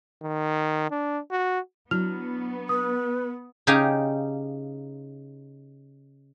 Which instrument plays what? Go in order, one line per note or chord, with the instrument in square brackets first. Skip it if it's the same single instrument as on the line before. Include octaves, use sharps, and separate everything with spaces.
[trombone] D#3
D4
F#4
[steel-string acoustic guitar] F#3 D4 [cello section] B3 [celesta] E4 F6 F7
[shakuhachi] B4 [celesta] D#6
[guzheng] C#3 D#4 G4 F5 G5 G#5